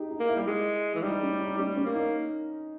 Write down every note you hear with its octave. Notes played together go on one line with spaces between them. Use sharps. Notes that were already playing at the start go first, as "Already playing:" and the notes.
Already playing: D#4 G4 G#4
D#4
A#3
E4
G3
G#3
E3
G3 D#4
C#4
D#4
G3 C#4
C#4
A#3
D#4